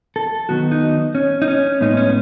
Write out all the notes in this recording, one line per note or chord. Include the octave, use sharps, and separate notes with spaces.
A4
D#3 F#3 B3 F#4
D#4
C#4
D#4
C#4
A2 G#3 B3 D#4
C#4